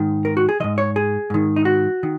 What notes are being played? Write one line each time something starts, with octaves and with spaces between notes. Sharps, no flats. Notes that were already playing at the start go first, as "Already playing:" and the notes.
Already playing: G#2 D#3
A#4
F#4
G#4
G#2 D#3 D#5
C#5
G#4
G#2 D#3
D#4
F#4
D#3